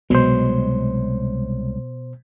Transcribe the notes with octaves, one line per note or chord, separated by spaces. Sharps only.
C2 B2 F#3 G#3 C5